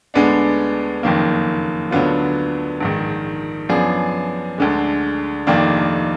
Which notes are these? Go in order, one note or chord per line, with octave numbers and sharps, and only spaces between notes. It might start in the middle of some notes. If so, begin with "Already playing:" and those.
D2 D3 G#3 B3 D4
F#1 F2 D#3 A#3
D2 D3 F#3 B3 F4
A#1 G#2 D#3
F#2 F3 B3 D4 G#4
D2 D3 G#3
F1 F2 D#3 A#3 D4